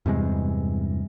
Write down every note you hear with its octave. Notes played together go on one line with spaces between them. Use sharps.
E2 G2 C3 G#3